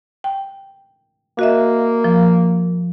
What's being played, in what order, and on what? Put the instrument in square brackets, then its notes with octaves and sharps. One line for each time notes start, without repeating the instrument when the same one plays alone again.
[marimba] G5
[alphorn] A#3 [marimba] F#4 D#5 E5
[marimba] F3